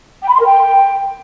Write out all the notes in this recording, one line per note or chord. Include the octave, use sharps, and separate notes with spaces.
G5
B5
C6
A#4
G5